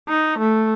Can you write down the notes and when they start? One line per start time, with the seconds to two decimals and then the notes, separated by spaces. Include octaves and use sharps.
0.09 D#4
0.39 A3